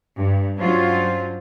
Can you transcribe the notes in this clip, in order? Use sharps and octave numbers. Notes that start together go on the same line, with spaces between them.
G2
F#3 C#4 D4 F4 C5